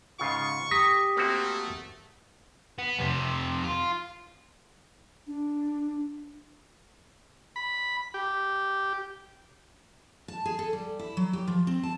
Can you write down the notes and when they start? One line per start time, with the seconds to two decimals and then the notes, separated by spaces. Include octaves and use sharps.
0.19 G#2 C#3 F4 C#6
0.71 G4 A#5 D#6 A#6 B6
1.17 A3 A#3 C4 F#4
2.78 B3
2.99 F2 C3
3.64 F4
5.27 D4
7.56 B5
8.14 G4
10.28 A5
10.46 G#4
10.59 A4
10.73 G3
10.99 E4
11.17 F#3
11.33 G4
11.47 F3
11.67 C4
11.83 A5